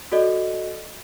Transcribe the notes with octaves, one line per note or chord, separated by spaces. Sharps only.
F#4 A4 D5 D#5